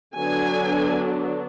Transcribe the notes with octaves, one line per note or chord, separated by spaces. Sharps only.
D3 F#3 B3 D4 G#5